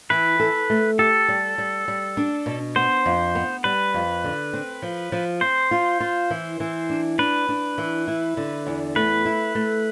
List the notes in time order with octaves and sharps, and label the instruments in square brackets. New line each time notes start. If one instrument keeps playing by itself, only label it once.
[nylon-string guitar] E3 [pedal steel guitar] B4
[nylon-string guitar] A4
A3
[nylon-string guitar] G4 [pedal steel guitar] A4
[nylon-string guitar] G3
G3
G3
D4
B2
[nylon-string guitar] B3 [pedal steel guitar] C5
[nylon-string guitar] F2
B3
[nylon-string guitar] G3 [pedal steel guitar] B4
[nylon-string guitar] F2
D3
C4
F3
F3
[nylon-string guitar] C4 [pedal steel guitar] C5
[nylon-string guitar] F4
F4
E3
E3
D4
[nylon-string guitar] D4 [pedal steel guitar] B4
[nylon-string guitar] D4
E3
E4
D3
E2
[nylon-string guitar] A3 [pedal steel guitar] B4
[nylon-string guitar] E4
A3